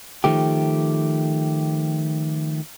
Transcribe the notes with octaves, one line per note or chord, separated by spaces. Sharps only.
D#3 F3 A3 G4